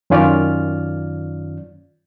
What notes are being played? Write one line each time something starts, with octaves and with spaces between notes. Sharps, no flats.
F#2 D#3 C#4 F4 D5 F6